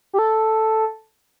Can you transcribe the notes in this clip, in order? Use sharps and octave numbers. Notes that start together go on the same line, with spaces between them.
G4
A4